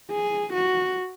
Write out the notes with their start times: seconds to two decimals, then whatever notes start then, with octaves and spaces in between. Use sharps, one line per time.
0.11 G#4
0.53 F#4